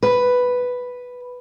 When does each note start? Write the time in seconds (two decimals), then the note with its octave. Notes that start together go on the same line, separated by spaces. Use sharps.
0.03 B4